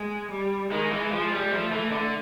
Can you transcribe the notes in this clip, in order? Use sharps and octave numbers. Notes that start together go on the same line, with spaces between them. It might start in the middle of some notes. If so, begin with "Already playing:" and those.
Already playing: G#3
G3
D#3 G#3
E3
F3
G3
F3 A3
E3
D3